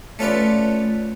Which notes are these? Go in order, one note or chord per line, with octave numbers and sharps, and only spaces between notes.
A3 C#4 F4 B4 D5